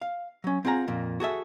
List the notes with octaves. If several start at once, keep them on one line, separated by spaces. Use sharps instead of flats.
F5
F#3 C#4
C4 F4 G#4 F#5 A#5
F2 A#2 A#3
F#4 G#4 A4 E5